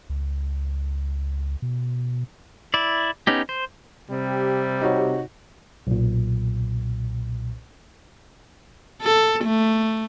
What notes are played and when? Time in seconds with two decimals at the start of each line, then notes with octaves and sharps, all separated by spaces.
0.10 C#2
1.62 B2
2.74 E4 D5
3.27 B3 C#4 D#4 G4
3.49 C5
4.10 C3 G3
4.81 D#4 F#4 C#5
5.87 B1 A#2
9.02 A4
9.44 A3